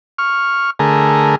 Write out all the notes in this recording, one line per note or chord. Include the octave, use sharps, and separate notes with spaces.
C#6 F6
D3 A3 G#4 A#4